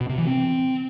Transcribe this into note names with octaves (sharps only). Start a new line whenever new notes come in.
B2
C3
E3
C4